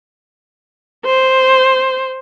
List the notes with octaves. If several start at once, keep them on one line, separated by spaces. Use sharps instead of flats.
C5